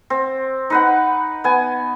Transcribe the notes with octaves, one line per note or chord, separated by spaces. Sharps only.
C4
D#4 B4 F#5
B3 G#5